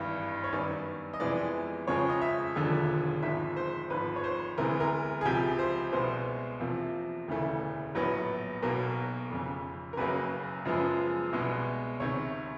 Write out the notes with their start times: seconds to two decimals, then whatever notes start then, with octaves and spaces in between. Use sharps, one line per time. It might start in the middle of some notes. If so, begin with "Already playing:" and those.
Already playing: G#1 G2 E3
0.44 C#5
0.52 F#2 D#3 G3 B3 D5
1.13 D#5
1.20 F2 C3 E3 G#3 B3 D5
1.87 F2 C#3 F3 G#3 C#5
2.10 D#5
2.22 E5
2.56 E1 D#2 D3 F3
3.23 G#1 G#2 F3 E5
3.56 C5
3.90 G#1 G#2 F3 B4
4.16 C#5
4.24 C5
4.58 D2 C3 E3 G#3 B3 A#4
4.80 A#4
5.21 G#4
5.25 C#2 C3 F3 G4
5.59 C5
5.92 C2 B2 G#3 B3 C5
6.60 E2 C3 F3 A#3
7.28 E1 D2 C#3 E3 A3
7.95 A#1 A2 F#3 B3
8.62 B1 B2 F#3 A#3 A#4
9.30 F1 F2 C#3
9.93 A#4
9.97 F#1 F#2 C#3 F#3 A#3 B4
10.65 F#2 C#3 F3 G#3 B3
11.33 C2 B2 G#3 B3
12.00 C#2 C3 D#3 C#5